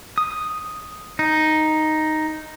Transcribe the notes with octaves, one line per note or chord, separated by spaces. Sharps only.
D#6
D#4